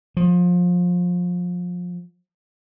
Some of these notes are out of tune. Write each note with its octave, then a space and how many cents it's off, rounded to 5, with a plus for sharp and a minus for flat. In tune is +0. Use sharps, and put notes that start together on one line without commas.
F3 +25